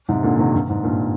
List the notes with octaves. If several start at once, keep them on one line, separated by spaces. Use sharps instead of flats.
G#2 C3
A#2 D3
C3 D#3
G2
G#2
G2 A#2